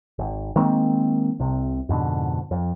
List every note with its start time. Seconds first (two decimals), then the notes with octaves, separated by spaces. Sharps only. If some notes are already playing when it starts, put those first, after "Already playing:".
0.19 G#1
0.56 D#3 G#3 A#3 C4
1.39 C2 C3
1.89 F2 G#2 B2 D3
2.51 F2